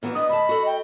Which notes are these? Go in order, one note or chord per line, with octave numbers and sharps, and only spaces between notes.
D#3 E3 B3 F#4
B3 D4 D#5 D#6
D2 A5 B5
F#4 A4
G5